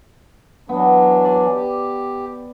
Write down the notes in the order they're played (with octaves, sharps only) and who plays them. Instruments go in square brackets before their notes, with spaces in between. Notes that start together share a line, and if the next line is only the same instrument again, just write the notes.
[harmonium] E3 F#3 D4 [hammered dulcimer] B3
[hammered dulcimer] D5 G#5
[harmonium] G4